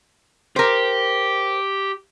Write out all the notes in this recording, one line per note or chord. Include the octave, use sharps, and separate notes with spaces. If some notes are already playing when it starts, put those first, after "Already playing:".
G4 A#4 C5